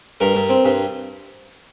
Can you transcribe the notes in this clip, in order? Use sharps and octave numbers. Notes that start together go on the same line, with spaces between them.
G2 A#4
G2
C4
G2